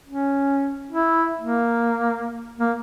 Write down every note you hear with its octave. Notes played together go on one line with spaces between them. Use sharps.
C#4
E4
A#3
A#3